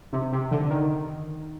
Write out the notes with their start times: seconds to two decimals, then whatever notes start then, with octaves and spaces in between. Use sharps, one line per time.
0.13 C3
0.32 C3
0.51 D3
0.70 D#3